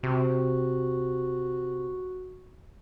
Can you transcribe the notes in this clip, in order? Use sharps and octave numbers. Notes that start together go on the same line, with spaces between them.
C3 F#4